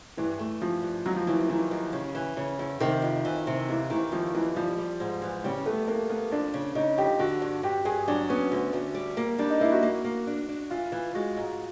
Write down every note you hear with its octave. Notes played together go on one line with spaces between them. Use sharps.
G2 E3
A3
G2 F3
G2
D#2 F#3
F3
D#2 E3
E3
D#3 E3
D#2
C#3
E3
C#3
E2
C3 D#3
F2
E3
C3
D#2 E3
D#3 E3
D#2 F3
D#2 E3
F3 G3
G3
G#2
E3
C#3 G3
A3 B3
E2 A#3
A#3 B3
F2 D4
C#3
C#3 D#4
F2 G4
D3 F#4
G2
G2 G4
G2 G#4
F#3 D4
B3 C#4
D2
D2
G3
A#3
G3 D4
D#4
A#3 E4
F#4
A#3
A#3
D4
D4
E3 F4
E3
G#3 F#4
G#2